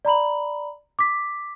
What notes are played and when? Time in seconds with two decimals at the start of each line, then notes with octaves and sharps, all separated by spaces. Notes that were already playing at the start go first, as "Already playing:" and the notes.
0.05 D5 A#5 B5 F#7
0.99 D6 B6